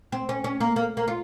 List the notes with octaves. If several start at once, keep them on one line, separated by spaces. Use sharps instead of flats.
C4
C#4
C#4
A#3
A#3
A#3
F4